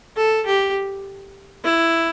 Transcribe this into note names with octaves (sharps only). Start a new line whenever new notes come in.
A4
G4
E4